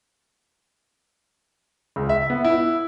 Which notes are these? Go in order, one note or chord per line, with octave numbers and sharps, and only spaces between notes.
C#2
E5
B3
E4